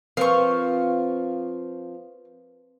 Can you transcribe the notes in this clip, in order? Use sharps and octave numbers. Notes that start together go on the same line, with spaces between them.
F3 C4 A#4 B4 F5 C#6